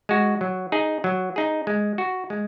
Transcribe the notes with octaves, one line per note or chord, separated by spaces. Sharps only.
G#3 F#4
F#3
D#4 G#4
F#3
D#4 G#4
G#3
F#4
G#3